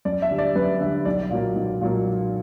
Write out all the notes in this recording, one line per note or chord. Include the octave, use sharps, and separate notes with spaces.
F#2 D5
E5
D3 G3
D5
F#2 B4
D3 G3 E5
B1 D5
A#2 F#3 A#3
B1
A#2 F#3 A#3